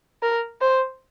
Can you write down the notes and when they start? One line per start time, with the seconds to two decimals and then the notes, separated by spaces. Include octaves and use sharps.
0.23 A#4
0.61 C5